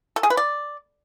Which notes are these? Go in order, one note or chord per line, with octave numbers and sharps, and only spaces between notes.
A4
G#4
B4
D5